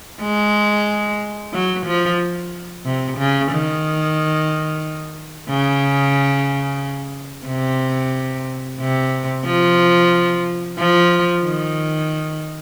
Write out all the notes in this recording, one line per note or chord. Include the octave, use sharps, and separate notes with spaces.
G#3
F#3
F3
C3
C#3
D#3
C#3
C3
C3
F3
F3
D#3